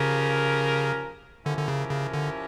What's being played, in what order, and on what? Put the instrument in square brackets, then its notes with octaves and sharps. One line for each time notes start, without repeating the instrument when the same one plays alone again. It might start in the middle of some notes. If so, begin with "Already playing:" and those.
Already playing: [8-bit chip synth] C#3 [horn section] F3 C#4 G4 A#4
[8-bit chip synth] D3 [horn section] F3 C#4 E4 G4 A#4
[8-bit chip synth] D3
C#3
C#3
D3